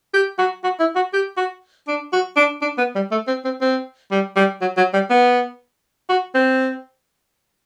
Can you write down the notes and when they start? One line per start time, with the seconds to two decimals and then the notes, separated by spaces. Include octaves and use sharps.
0.14 G4
0.38 F#4
0.64 F#4
0.80 E4
0.96 F#4
1.13 G4
1.37 F#4
1.88 D4
2.13 F#4
2.36 D4
2.62 D4
2.78 B3
2.95 G3
3.11 A3
3.27 C4
3.44 C4
3.61 C4
4.11 G3
4.36 G3
4.61 F#3
4.77 F#3
4.93 G3
5.10 B3
6.09 F#4
6.35 C4